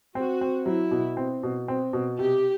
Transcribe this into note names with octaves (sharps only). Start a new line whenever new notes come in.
C4 F#4
C4
F#3 E4
B2
C4
B2
C4
B2
C3 G4